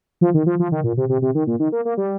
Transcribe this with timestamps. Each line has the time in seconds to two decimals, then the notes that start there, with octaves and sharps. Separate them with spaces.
0.21 F3
0.34 D#3
0.46 F3
0.59 F3
0.72 D#3
0.84 A#2
0.97 C3
1.09 C3
1.22 C3
1.35 D#3
1.47 A#2
1.60 D#3
1.72 A#3
1.85 A#3
1.97 G3